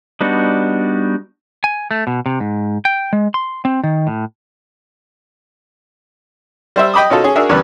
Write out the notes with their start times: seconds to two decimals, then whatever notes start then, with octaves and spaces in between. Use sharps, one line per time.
0.21 G3 B3 D4 D#4 F#4
1.64 G#5
1.91 A3
2.07 B2
2.26 C3
2.40 G#2
2.85 G5
3.13 G#3
3.34 C6
3.65 C4
3.84 D#3
4.07 A2
6.76 G3 C5 E5
6.94 D#5 G5 B5 D6 D#6
7.10 B2 C#4 D#4 F4 A4
7.24 C#4 G#4
7.36 D4 F#4 G#4 A#4 E5
7.49 E2 C#3 G3 B4